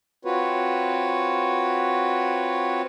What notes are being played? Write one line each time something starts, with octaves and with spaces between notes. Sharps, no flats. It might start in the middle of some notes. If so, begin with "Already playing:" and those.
C4 F4 F#4 B4 C#5